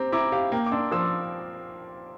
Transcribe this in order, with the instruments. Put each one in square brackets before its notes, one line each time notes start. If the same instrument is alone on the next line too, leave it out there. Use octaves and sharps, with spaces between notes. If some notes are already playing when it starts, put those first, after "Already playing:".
Already playing: [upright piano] C4 G4 [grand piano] A#5 D6
[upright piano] E4 [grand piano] A#5 D6
[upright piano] G4 [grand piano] F5
[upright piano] A#3 [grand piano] G5 A#5
[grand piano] D6
[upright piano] D4 [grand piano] C6 E6
[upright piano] F3 [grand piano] C6 E6